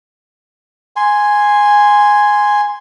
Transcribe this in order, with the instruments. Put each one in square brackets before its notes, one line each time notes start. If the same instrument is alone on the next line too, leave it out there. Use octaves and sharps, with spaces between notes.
[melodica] G#5 C6